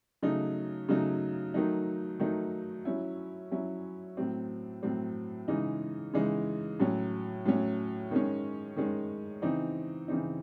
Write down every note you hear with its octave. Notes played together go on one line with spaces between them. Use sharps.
C#3 F#3 A3 D#4
C#3 F#3 A3 D#4
D#3 F#3 A3 D#4
D#3 F#3 A3 D#4
F#3 C#4 E4
F#3 C#4 E4
A2 F#3 C4
A2 F#3 C4
C#3 E3 G#3 D#4
C#3 E3 G#3 D#4
A2 F#3 C#4
A2 F#3 C#4
D#3 G#3 C#4
D#3 G#3 C#4
C#3 E3 C4 D#4
C#3 E3 C4 D#4